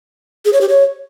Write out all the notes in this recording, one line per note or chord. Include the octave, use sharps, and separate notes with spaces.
G#4
C#5
G4
C#5